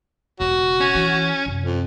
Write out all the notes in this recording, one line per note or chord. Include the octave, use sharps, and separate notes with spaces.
E1 C#3 F#4
C#4
E3
F#2 C3
F2